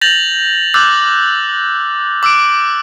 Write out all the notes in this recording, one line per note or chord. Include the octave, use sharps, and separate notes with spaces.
G6 A6 A#6 F7 F#7
D6 E6 F#6 G6 A6
D6 E6 F#6 D7